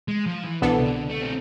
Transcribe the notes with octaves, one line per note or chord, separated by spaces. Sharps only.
G#3
F3
E3
C2 B2 E3 B3 D4 A4
C3
D3
A3
C4